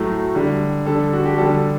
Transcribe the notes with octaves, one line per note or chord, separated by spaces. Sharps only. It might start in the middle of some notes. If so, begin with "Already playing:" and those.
Already playing: A2 F#3 A3
D3 G3
D3 G3 A4
F#4
G4
D3 G3 A4